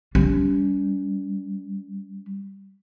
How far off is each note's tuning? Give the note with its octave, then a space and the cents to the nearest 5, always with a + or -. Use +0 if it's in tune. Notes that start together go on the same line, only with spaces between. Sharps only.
G3 +0 C#4 +40